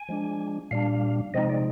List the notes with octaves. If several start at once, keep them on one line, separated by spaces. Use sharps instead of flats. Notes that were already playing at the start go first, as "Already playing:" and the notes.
Already playing: G#5
F3 G#3 D4
A#2 G3 D4 F5
C3 F3 G#3 C4 D#4 D#5
D5